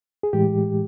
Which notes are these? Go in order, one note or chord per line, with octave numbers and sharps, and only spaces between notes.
G#4
A2 E3 G#3 G4